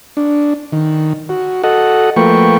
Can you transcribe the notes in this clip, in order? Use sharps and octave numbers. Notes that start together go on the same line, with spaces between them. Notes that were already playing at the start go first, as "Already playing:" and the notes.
D4
D#3
F#4
F#4 A4 D#5 F#5
F3 A3 A#3 B4 G5 C#6